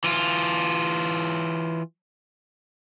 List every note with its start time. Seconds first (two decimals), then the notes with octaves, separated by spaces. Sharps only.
0.04 E3 F4